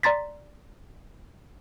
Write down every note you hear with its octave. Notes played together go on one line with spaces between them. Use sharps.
D5 A#5 C6 A6 B6